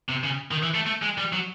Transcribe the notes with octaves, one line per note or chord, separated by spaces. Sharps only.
C3
C#3
D#3
E3
A3
A3
G#3
G3
F#3